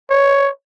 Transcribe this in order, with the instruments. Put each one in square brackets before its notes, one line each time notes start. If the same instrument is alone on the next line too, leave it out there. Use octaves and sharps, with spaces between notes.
[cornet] C#5